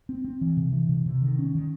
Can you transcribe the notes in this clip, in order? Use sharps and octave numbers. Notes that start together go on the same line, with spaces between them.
C4
C4
E3
C3
E3
C3
C3
D#3
C#4
D#3